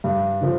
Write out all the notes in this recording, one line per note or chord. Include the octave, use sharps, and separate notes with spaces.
G2
D3 F3